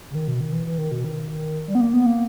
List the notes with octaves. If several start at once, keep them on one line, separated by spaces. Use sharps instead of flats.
C#3
D#3
B2
D#3
E3
E3
D#3
B2
D#3
G3
B3
A#3
B3
A#3